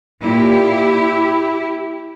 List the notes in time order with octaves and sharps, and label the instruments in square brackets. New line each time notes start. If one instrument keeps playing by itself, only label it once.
[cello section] A#2 E4 G4